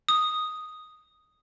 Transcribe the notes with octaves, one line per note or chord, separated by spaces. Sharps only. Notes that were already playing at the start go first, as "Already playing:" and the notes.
D#6